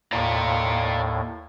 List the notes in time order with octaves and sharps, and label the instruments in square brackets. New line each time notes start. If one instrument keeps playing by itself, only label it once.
[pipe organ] D#2 A2 [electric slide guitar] D5 F5 A#5